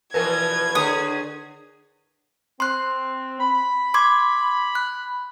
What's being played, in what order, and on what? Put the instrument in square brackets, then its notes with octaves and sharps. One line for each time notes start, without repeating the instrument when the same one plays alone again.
[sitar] E2 B2 F3 [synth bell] A#4 B4 [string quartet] G#6
[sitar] D3 G#4 C#5 [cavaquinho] D#6
[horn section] C4 [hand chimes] C6 F#6
[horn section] B5
[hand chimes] C6 D6 G#6
F#6